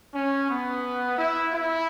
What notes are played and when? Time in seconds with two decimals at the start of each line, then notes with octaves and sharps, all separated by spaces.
0.15 C#4
0.50 B3
1.18 E4
1.53 E4